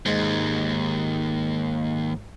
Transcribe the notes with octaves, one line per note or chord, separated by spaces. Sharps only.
D#2 G#2 G#3